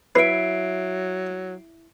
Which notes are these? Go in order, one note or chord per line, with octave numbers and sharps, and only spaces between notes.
F#3 E4 B4 E5 C7 D7